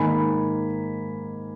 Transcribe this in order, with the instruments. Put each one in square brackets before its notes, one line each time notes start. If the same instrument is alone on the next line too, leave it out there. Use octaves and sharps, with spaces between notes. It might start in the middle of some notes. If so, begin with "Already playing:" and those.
Already playing: [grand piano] G#2 D#3 A#3 G#5 B5